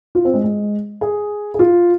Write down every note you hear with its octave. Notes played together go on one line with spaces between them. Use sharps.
F4
C4
G#3
G#3
G#4
G#4
F4